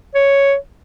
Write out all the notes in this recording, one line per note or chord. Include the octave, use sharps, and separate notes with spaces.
C#5